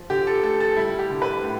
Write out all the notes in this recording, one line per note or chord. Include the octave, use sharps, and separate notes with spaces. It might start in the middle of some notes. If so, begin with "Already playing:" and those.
Already playing: F3
D3 G4
A4
A3 A4
A4
G3 E4
G4
D3
B4
A2